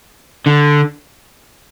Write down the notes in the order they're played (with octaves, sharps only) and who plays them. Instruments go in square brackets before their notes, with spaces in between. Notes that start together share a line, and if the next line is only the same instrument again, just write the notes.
[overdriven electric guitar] D3